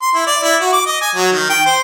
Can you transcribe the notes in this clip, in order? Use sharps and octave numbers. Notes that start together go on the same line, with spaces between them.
C6
E4
D5
E4
F#4
D6
D#5
G#5
F#3
D#3
G5
C5